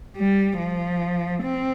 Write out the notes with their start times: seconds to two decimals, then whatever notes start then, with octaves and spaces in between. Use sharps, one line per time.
0.17 G3
0.59 F3
1.43 C4